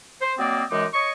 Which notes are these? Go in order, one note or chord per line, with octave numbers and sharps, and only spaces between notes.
C5
F#3 A#3 C4 D5 D#5
F#2 E3 G#3 D#4 D6
C#5 D#5 C#6